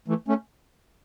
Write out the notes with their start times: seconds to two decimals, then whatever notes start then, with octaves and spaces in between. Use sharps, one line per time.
0.08 E3 A3
0.28 A3 C#4